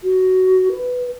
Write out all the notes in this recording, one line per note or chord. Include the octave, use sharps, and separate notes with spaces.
F#4
B4